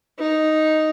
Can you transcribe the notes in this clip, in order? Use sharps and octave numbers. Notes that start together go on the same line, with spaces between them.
D#4